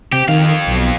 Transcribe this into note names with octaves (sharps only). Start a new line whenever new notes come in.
C3 G4
F2 D#3 F5
B1